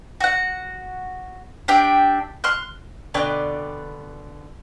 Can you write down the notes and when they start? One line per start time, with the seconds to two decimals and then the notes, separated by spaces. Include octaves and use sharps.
0.20 F#4 F#5
1.68 D4 G4 E5 G5
2.44 C6 F6 F#6
3.14 B2 D3 B4 D5 G5